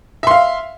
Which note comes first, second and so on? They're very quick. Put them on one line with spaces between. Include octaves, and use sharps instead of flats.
E5 C6 F5